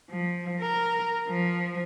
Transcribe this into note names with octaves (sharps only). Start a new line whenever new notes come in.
F3
A#4
F3